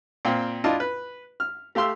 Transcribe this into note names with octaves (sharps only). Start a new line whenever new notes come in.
A#2 C4 F5 G5
D4 E4 F4 D#5 A5
B4
F6
A3 G4 F5 C6 E6